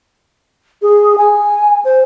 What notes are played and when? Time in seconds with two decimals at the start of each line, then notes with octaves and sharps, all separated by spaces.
0.82 G#4
1.18 G#5
1.85 C5